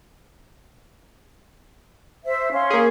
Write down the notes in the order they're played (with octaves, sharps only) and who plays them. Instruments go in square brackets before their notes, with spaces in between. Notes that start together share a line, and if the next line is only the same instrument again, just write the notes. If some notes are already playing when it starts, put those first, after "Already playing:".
[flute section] C5 E5
C#4 F5 C6
[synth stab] A#3 G#4